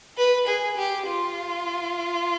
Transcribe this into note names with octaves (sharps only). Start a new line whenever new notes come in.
B4
G#4
G4
F4